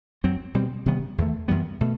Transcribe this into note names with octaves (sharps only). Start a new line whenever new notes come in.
F#2 F#3 C4
B2 G3 C4
C3 D#3 G3 B3
E2 D#3 A3
F#2 E3 G3 B3
B2 A3